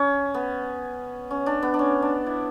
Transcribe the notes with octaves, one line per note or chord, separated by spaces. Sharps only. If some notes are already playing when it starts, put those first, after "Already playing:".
Already playing: C#4
B3
C#4
D4
B3
D4
C#4
D4
E4